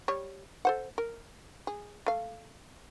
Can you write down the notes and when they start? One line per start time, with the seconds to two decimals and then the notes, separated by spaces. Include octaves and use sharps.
0.08 G3 C#5
0.65 A4 C5 F#5
0.98 A#4
1.67 G#4
2.06 A3 F5